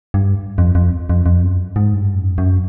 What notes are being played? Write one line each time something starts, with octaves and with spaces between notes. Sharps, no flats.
G2
F2
F2
F2
F2
F#2
G#2
G2
F#2
F#2